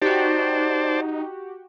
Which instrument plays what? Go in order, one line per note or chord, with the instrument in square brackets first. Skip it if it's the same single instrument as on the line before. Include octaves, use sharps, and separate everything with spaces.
[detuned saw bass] D#4 [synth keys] F#4 G4 [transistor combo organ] C5 D5 A5